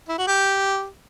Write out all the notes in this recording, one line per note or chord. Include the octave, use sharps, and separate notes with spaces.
E4
F#4
G4